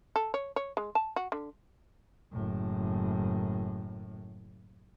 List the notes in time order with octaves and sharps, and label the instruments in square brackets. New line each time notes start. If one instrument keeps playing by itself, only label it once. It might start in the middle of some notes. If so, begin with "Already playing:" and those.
[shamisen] A4
C#5
C#5
G#3
A5
F#4
D3
[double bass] F#1 A2